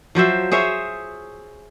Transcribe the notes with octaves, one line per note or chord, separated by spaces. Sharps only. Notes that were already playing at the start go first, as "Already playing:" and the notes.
F3 F#3 C5 E5
G#4 C5 C#5 E5